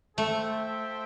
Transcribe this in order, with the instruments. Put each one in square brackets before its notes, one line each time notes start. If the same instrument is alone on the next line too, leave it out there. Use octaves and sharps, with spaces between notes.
[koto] A3 [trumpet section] F4 A4 C5 E5 G5